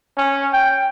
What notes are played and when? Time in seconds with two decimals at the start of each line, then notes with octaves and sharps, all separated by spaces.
0.17 C#4
0.53 G5